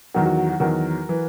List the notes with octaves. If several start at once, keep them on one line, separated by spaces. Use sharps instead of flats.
E2 D#3 F#3 F#4 A#4
F#4
F#4
F#4
E2 D#3 F#3 F#4 A#4
E3